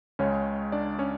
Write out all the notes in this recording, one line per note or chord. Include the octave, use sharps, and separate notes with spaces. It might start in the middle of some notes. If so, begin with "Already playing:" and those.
C#2 C#3 G#3 C#4 C#5
D4 D5
C#4 C#5